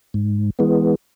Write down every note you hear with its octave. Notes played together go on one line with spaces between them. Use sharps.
G#2
E3 G#3 B3